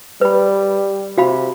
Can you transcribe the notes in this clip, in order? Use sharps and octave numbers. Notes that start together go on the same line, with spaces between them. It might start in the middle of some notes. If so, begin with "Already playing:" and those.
G3 B4 B5
C3 F#4 F5 B5